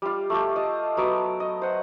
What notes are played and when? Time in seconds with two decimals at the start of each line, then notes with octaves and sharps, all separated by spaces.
0.02 G3 F4
0.30 A3 F4 G4
0.56 D#5 A5
0.97 F#3 B3 D6
1.40 D#5
1.62 C5 F#5